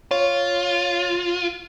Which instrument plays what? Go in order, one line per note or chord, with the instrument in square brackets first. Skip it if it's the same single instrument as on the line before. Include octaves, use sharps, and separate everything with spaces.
[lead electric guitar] F4 [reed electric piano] C#5